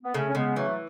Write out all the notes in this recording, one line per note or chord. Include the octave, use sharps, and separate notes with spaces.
B3
C#3 A3 C#4
C#4
C#3 G#3 B3
E3 F#3 A3